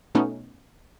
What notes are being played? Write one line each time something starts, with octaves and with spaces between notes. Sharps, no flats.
B2 A3 B3 C#4 D#4